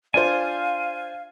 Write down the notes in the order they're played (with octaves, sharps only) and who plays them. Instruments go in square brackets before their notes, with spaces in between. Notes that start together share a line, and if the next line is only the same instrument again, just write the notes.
[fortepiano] D4 F4 C5 [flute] F5 [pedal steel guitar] G#5